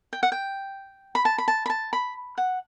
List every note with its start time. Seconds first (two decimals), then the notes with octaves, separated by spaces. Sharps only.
0.13 G5
0.23 F#5
0.32 G5
1.15 B5
1.25 A5
1.38 B5
1.48 A5
1.66 B5
1.70 A5
1.93 B5
2.38 F#5